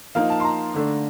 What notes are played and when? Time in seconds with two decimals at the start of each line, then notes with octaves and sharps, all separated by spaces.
0.15 F3 A#3 D#4 F5
0.30 A5
0.40 C6
0.44 A#5
0.74 D3 A3 D4